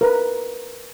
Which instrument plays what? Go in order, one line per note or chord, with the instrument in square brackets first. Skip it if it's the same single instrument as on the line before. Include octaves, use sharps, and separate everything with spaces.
[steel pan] A#4 B4